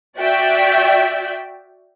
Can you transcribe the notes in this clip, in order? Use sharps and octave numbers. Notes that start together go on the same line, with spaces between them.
F#4 D5 E5 G5